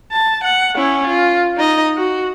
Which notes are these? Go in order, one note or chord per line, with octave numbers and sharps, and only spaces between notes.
A5
F#5
C#4 E4
F4
D#4 D#5
F#4